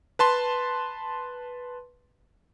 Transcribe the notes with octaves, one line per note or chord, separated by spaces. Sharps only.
B4 A5 C6